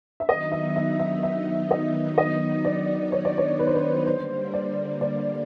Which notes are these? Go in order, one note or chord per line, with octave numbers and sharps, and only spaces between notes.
E5
D#3 F#3 B3 D#4 D#5
E5
E5
E5
E5
D#5
D#5
D5
C#5
D5
C#5
B4
C5
B4
D3 G3 A#3 C5
D5
D5